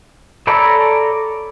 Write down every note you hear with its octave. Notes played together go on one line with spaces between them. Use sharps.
A4 C#5 D5 A#5 B5